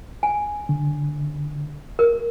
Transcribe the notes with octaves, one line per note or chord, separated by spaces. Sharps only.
G#5
D3
A#4